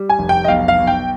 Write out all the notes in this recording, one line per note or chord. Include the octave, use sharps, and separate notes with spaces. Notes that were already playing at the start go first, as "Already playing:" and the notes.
Already playing: G3
G#5
F1
G5
D#5
B1 F5
F5
B1
G5